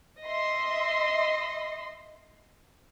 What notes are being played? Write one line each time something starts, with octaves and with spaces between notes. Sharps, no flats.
D#5 E5 C6